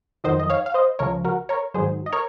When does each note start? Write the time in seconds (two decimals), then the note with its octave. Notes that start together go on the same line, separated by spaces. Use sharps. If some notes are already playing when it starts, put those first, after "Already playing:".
0.24 F2 D#3 F#3 C5 D#5
0.40 D#5
0.50 C#5 F5
0.66 F5
0.74 C5 D#5
0.99 C#2 C#3 F3 A#4 C#5
1.25 F#4 A#4
1.49 A#4 C#5
1.74 G#2 D#3 F#3 G#4 C5
2.06 D#5
2.12 A#4 C#5